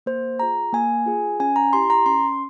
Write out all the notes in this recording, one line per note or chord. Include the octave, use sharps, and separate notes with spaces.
A#3 C5
F4 G#4 A#5
A#3 G#5
F4 G#4
C#4 G#5
A#5
E4 G4 C6
A#5
C#4 C6